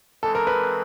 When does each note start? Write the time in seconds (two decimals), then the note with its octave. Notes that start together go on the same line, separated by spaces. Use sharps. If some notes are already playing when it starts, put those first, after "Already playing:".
0.23 E3 G#3 C4 A4
0.35 A#4
0.47 B4